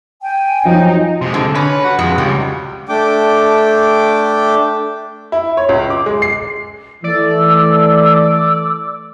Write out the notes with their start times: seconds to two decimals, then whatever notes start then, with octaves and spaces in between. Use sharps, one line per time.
0.22 G5 G#5
0.65 F3 F#3 D#4
1.22 C3 G#3
1.34 D3
1.55 C#4 B4
1.84 F#4
1.99 F2 G#3
2.18 C#2 G3
2.89 A3 D4 G5 D6
5.32 E4
5.57 C#5
5.69 C#2
5.90 D6
6.06 G#3
6.22 C7
7.04 E3 A3 D5 E6